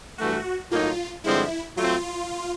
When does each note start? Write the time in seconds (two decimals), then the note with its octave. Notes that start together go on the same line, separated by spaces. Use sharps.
0.18 G2 E3 A3 F#4
0.71 A2 F#3 A#3 D#4 F4
1.24 G2 D3 F3 G#3 C4 E4
1.76 F#3 A3 C4 F4